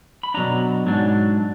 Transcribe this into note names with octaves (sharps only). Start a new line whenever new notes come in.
B5
B2 F#3 D4 A#5
G#2 F#3 D4